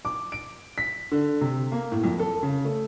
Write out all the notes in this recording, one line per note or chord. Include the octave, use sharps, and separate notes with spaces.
D6
D7
B6
D3
C3
A#3
A2
F2
A4
C#3
A3